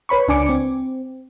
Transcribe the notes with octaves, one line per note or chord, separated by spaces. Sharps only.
B4 C#5 B5 C#6
C#2 D4 G#5 D6 C#7
C4